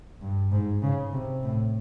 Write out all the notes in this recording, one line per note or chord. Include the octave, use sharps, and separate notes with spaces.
G2
G#2
C#3
C3
A2